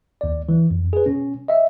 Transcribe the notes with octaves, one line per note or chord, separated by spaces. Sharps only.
D#2 D5
E3
F2
G#4 B4
B2 C#4
D#5 E5